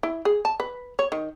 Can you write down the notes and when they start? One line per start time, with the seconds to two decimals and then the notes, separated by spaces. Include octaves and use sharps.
0.03 E4
0.25 G#4
0.45 A5
0.60 B4
0.99 C#5
1.12 D#3